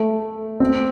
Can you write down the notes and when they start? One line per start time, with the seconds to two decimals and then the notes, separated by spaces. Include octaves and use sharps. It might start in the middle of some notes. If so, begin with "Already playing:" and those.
Already playing: A3
0.60 C4